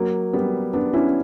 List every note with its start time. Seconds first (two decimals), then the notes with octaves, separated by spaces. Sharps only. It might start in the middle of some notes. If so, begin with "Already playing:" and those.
Already playing: F#3 A#3
0.33 G3 B3
0.74 B3 D4
0.93 C#4 E4